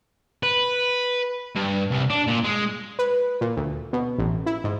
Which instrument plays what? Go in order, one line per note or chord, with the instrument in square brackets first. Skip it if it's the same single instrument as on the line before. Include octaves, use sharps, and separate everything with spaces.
[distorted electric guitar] B4
G2
C2
D4
A#2
G#3
[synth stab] B4
A#2
D2
B2
A1
E4
G#2